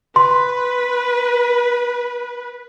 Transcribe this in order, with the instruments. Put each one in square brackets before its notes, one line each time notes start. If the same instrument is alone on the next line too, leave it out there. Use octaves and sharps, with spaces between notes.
[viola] B4 [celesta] C6